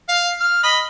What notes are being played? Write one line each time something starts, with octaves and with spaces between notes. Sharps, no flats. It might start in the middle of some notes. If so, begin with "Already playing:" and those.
F5
F6
D#5 B5